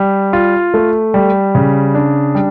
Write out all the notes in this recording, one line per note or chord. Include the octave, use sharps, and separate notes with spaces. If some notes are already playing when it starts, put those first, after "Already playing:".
Already playing: G3
F4
A3
G3
C#3
D4
G3